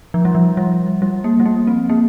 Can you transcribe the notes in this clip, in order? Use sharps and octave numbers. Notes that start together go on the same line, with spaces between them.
F3
G3
F3
G3
G3
A#3
G3
A#3
C4
A#3